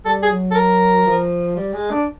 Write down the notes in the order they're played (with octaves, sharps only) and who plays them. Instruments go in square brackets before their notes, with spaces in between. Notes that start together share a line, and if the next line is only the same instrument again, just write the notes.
[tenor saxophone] G3 [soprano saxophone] A4
[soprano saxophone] G#4
[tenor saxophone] F#3
[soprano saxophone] A4
A#4
[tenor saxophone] F3
G3
G#3
D4